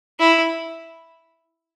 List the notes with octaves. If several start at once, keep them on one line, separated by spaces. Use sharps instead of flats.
E4